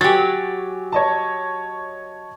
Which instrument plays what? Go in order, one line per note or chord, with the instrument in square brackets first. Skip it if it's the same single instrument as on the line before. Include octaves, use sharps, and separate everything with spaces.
[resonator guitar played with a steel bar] F#3 G4 [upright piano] G#5 A6
[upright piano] C#5 D#5 A5